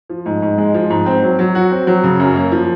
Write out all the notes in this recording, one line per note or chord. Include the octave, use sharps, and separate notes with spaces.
F3
G#2
G#2
G#3
F3
G#2
C4
F#3
F#3
F#4
C4
F#3
C#3
F#2
A#3
F3